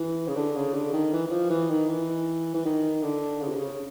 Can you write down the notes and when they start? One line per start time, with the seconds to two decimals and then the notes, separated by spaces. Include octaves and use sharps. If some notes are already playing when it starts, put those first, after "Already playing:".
Already playing: E3
0.27 C#3
0.36 D3
0.56 C#3
0.74 D3
0.93 D#3
1.13 E3
1.27 E3
1.32 F3
1.50 E3
1.70 D#3
1.89 E3
2.54 E3
2.65 D#3
3.02 D3
3.41 C#3
3.48 C3
3.56 C#3